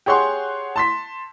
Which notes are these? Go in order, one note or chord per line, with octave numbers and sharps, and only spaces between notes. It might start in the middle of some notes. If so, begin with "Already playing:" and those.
G4 G#4 C#5 F#5 C6 C#6
A5 C6 B6